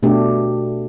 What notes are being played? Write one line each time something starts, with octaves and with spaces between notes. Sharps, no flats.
B2 A3 D4 G4